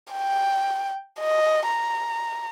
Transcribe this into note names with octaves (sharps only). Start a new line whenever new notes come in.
G5
D#5
A#5